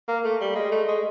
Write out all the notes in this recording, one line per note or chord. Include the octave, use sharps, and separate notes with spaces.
A#3
A3
G3
G#3
A3
G#3